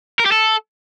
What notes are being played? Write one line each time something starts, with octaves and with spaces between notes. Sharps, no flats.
A#4
G4
A4